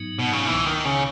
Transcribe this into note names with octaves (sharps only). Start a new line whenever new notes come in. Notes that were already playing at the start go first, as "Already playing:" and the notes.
Already playing: G#2 F#3 B3 D#4
B2
C#3
C#2 B2 E3 A#3
D#3
C#3